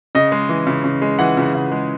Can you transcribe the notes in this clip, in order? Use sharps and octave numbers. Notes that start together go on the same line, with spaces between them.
C#3 D#5
G#3
E3
C#3
C#3
G#3
E3 F#5
C#3
C#3
G#3